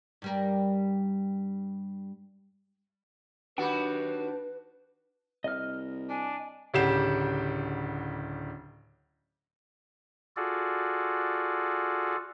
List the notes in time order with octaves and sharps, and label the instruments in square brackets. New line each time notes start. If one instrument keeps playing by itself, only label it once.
[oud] G2 G3 A#4
[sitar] D#2 F#4 G4 [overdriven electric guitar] D4 B5 [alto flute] B4 [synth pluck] F#5
[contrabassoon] C2 [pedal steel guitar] D#5 F6
[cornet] D4 [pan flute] G#5
[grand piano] D1 C#3 G4 F#5 C7 E7
[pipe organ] F4 F#4 G#4 A4 D5